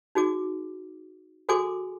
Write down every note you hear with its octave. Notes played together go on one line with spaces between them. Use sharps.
D#4 F#4 G#4 D6
F#4 G#4 A4 G#5 C6 D6